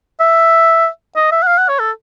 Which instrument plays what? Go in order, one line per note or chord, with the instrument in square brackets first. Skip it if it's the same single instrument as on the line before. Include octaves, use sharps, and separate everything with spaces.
[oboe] E5
D#5
E5
F#5
F5
F#5
C#5
A4